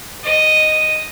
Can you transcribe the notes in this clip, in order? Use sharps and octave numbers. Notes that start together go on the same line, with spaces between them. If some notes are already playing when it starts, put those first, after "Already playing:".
D#5